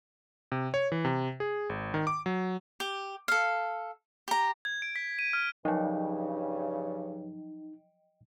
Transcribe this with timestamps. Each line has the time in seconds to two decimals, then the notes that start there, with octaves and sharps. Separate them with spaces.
0.52 C3
0.74 C#5
0.92 E3
1.05 C3
1.40 G#4
1.69 G#1
1.94 D#3
2.07 D6
2.26 F#3
2.80 G4
3.28 A4 F5
4.28 G4 A#5
4.65 G#6
4.82 D7
4.96 B6
5.19 D#7
5.33 F6
5.65 G2 C#3 F3 F#3 D#4 D#5 G5